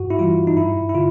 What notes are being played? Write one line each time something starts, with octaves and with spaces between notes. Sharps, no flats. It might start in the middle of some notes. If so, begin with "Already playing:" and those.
Already playing: G2 F#4
E4
E3 G3 F4
D#4
G2 E4
E4
D3 F4